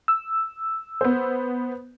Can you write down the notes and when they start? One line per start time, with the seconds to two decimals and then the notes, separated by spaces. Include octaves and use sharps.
0.08 E6
1.01 B3 C5